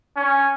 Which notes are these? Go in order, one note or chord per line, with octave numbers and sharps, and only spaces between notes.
C#4